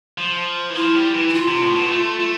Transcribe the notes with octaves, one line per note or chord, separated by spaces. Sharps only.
F3
E3
F3 E4
G3
E3
E4
F4
C3
A2
B2
A3
A3